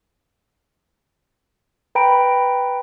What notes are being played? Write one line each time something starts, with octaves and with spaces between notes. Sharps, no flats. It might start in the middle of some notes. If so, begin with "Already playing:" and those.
B4 G5 A#5 B5 D7